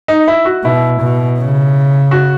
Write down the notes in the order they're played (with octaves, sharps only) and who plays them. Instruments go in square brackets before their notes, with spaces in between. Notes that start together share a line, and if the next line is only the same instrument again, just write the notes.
[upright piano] D#4
E4
F#4
[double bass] B2 [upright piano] E4
[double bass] B2
C#3
[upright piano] F#4